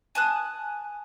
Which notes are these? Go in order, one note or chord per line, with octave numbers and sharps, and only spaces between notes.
G#5 A5 D#6 F#6